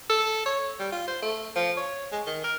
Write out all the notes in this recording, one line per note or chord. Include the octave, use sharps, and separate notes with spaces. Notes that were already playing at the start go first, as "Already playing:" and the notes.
A4
C#5
G3
F4
C5
A3
F3
C#5
G#3
D#3
A#4